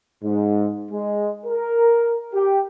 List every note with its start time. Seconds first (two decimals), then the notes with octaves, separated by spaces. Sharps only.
0.24 G#2
0.91 G#3
1.46 A#4
2.34 G4